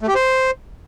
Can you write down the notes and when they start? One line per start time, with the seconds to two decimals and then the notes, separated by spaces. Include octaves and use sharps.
0.01 A3
0.08 G4
0.15 C5